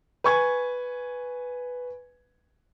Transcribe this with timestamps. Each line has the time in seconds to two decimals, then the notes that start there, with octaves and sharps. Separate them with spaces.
0.24 B4 G#5 C#6 G#6